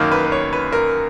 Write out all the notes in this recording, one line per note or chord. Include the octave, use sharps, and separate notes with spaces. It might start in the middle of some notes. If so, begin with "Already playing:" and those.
Already playing: F#2 D#3 A#3
B4
B4
C#5
B4
A#4